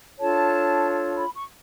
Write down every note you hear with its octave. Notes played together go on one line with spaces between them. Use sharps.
D4 F4 A4 C#5 A5
B5
C#6